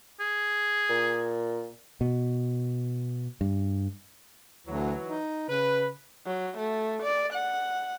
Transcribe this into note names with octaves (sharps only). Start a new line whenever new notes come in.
G#4
A#2
B2
G2
D2 E3 F#3
D#4
C#3 B4
F#3
A3
D5
F#5